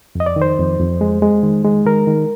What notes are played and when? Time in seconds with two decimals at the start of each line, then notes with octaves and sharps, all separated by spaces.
0.15 F2 D#5
0.26 D5
0.36 D#3
0.42 C5
0.59 F2
0.80 F2
1.01 G#3
1.22 G#3
1.43 D#3
1.65 G#3
1.85 D#3 A#4
2.07 D#3